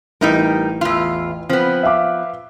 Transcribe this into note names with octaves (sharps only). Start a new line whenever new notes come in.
A1 G3 D#4 A#4
E2 F4
F3 B3 C4
E5 F5 D6